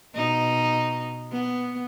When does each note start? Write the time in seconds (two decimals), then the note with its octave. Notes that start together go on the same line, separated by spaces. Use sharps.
0.14 B2 D#4
1.32 B3